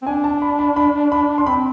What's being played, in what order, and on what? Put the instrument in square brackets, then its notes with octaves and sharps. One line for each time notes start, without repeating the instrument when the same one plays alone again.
[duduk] C4
[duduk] D4 [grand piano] G#5
[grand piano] A5
B5
B5
B5
B5
C6
[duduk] C4 [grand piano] B5